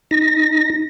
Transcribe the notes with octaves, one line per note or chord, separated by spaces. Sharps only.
D#4 A#6